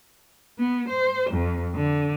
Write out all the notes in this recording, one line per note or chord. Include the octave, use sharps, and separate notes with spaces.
B3
C5
F2
D3